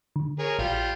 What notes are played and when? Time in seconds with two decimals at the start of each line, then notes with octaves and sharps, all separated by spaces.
0.16 D3
0.39 G#4 A#4 C#5
0.59 A1 G3 F4